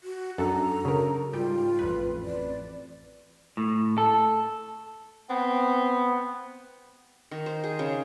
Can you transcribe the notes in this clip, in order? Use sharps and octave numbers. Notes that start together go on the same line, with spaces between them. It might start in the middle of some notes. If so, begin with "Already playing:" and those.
F#4
F#2 D4 F#4 A4 A#5
C#3 A#4
G#2 G3 F4 G5
A1 F2 B4
D5
A2
A4
B3 C4
D#3
C5
G#4
C#3